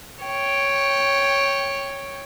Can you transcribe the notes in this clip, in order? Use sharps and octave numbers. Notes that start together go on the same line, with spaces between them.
C#5 G5